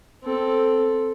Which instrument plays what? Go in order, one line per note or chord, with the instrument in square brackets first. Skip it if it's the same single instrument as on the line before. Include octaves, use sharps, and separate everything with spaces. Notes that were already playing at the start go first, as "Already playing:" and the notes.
[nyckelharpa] C4 A4